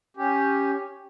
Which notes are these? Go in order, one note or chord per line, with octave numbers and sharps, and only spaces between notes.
C#4 G4